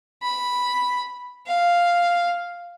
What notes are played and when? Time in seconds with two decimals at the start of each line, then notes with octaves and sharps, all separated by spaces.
0.22 B5
1.47 F5